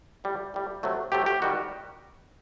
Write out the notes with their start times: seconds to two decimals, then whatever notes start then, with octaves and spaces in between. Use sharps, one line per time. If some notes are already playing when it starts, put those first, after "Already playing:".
0.24 A2 G3
0.54 A2 G3
0.83 C3 F#3 A3
1.12 C3 F#3 A3 G4
1.26 G4
1.42 D#3 G3 F#4